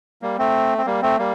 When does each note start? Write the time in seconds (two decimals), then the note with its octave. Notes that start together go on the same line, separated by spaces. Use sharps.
0.22 G3 A#3
0.38 A3 C4
0.78 C4
0.86 G3 A#3
1.02 A3 C4
1.18 G3 A#3